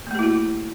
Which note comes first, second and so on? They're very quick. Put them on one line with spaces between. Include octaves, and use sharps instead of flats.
A#3 A3 G4 E4 F#4